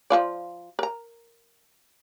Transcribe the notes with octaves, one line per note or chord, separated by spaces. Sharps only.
F3 F4 D5
A#4 A#5